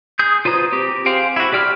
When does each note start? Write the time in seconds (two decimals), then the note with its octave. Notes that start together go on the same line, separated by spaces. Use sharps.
0.19 G#4 D#6 G6
0.45 F4 B4 C5 A#5 D#6
0.72 C4 G4
1.06 G#4 C5 F5 G5
1.36 E4 F#4
1.52 G4 D5 G5 F6